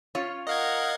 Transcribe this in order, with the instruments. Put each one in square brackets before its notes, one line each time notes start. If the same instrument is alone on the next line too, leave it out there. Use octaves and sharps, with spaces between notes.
[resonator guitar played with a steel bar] C#4 F4 C#5
[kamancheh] A#4 F#5 [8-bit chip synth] D#5 F5 G#6